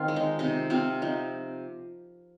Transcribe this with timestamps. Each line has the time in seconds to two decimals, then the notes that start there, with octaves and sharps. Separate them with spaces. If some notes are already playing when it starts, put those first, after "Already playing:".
Already playing: D#3 C4 F4
0.08 G#3
0.16 D#4
0.39 C3 D#4
0.70 C3 C4 F4
1.02 F3 D#4